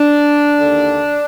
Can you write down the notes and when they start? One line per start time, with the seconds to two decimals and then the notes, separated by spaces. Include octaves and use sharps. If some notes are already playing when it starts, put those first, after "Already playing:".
Already playing: D4
0.58 D#2 D3